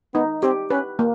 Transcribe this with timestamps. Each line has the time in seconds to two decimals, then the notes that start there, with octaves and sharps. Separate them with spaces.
0.14 B3 D#4
0.43 C4 G4
0.70 C#4 B4
0.99 A#3